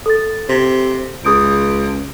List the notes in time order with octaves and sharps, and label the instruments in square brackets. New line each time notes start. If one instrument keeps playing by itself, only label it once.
[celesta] A4 A6
[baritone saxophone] C3
[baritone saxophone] C#2 [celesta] G#4 D#6 D7